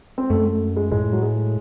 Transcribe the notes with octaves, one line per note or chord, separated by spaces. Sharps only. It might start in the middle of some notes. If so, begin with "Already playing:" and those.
C4
F#2 A3
A3
G#3
A2 G#3
F#3
G#3